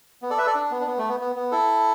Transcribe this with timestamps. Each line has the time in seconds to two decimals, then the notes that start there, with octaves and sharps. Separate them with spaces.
0.22 B3
0.30 A4 D5
0.38 B4 E5
0.47 A4 D5
0.55 D4
0.71 B3
0.80 D4
0.87 B3
0.98 A3
1.09 B3
1.20 B3
1.36 B3
1.52 E4 A4